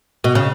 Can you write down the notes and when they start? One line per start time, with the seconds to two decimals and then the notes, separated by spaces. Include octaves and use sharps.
0.24 B2
0.35 C#3